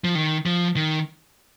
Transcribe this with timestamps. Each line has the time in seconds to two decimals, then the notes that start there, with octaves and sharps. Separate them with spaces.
0.04 F3
0.15 D#3
0.46 F3
0.76 D#3